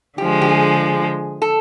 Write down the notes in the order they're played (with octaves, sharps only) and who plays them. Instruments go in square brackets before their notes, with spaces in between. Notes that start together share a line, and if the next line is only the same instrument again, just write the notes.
[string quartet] D3 F3 G#3 [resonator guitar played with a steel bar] G4
[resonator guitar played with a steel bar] G4
G#4
A4